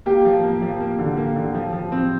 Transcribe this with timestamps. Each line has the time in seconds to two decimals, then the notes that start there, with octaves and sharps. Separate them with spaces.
0.06 A#3 G4
0.25 F3
0.44 A#3
0.62 F3
0.80 A#3
0.99 D3
1.17 A#3
1.36 D3
1.54 F3
1.73 F3
1.92 C4